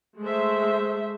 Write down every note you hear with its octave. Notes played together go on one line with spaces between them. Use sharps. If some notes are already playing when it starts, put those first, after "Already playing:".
G#3 A3 C5 E5